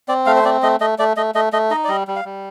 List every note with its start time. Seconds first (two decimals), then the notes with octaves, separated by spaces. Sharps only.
0.08 C4 D5
0.26 A3 F5
0.36 C5
0.45 C4 D5
0.63 A3 D#5
0.80 A3 D#5
0.99 A3 D5
1.17 A3 D#5
1.35 A3 D#5
1.53 A3 D#5
1.71 D#4 D#5
1.84 D5
1.88 G3 D#5
2.08 G3
2.16 F5
2.25 G3